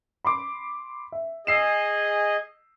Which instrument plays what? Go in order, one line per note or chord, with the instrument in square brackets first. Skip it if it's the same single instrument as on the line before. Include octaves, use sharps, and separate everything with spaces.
[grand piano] B5 C6 D6
E5
[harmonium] G#4 D#5 [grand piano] E6 C7 E7